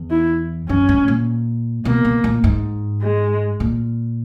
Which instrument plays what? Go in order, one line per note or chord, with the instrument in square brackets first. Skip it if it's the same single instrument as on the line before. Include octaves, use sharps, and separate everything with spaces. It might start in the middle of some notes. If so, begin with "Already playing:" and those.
Already playing: [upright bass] E2
[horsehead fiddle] E4
[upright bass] F#2 [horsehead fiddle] C#4
[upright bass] G#2
A#2
[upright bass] B2 [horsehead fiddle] A#3
[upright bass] B2
A#2
G#2
[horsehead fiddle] G#3
[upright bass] A#2